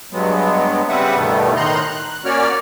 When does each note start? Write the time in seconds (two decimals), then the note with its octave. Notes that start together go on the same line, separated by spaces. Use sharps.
0.12 G2 F#3 G#3 B3
0.89 C#3 G3 C4 B4 E5 F#5
1.16 E2 G2 B2 D#3 A3 B3
1.56 A2 D#3 D#4 A#5 C6 F#6
1.81 F#6
2.25 A#3 C#4 F#4 C#5 D5 F6